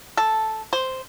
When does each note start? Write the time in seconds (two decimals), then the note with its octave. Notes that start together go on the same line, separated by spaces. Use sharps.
0.17 A4
0.73 C5